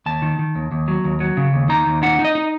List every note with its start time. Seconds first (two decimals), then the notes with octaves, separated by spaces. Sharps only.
0.06 D#2 A5
0.22 D#3
0.39 D#3
0.55 D#2
0.71 D#2
0.88 F#3
1.04 D#2
1.20 F#3
1.37 C#3
1.53 D#2
1.69 D#4 A#5
1.86 D#2
2.03 D#4 F#5
2.19 D#4
2.25 D#5
2.35 D#4